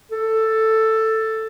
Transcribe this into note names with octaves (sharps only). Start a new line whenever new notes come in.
A4